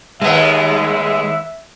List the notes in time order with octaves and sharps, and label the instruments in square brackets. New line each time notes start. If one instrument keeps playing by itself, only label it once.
[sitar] D#2 B3 [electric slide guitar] G#3 [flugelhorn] E5